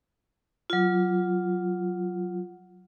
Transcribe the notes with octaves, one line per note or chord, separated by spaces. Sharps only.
F#3 F4